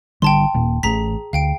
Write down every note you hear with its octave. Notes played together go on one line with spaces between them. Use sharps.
G#1 D3 G3 G5 A5 C6
D#1 A#2
A1 A2 G#4 A#5 B6
D2 F5 G5 D7